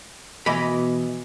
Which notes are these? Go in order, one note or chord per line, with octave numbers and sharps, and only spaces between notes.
B2 E3 D#5 B5